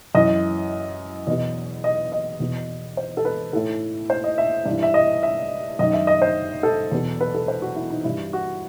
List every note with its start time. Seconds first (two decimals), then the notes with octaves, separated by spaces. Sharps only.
0.15 F#2 E3 D#5
1.27 E2 B2 D#5
1.84 D#5
2.12 D#5
2.40 E2 B2
2.97 C5
3.17 A4
3.25 B4
3.53 A2 E3 A4
4.10 C5
4.24 D#5
4.38 E5
4.66 G2
4.71 E3
4.83 E5
4.94 D#5
5.23 E5
5.79 F#2 D#3 D#5
5.93 E5
6.07 D#5
6.22 C5
6.63 A4
6.91 E2 B2
7.21 B4
7.35 A4
7.48 C5
7.62 F#4
7.76 E4
7.90 D#4
8.04 G2 E3 E4
8.33 F#4